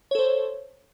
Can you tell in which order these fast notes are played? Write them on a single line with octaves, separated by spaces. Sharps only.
C#5 A4 C5